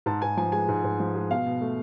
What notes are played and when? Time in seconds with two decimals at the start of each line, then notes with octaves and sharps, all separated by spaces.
0.06 G#2 A5
0.22 G#2 G#5
0.37 F3 G#5
0.52 G#3 G#5
0.68 G#2
0.84 G#2
1.00 F3
1.15 G#3
1.31 B2 F5
1.46 B2
1.61 A3